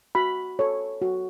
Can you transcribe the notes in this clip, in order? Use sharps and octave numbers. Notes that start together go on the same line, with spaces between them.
F#4 B5
A4 C#5
F#4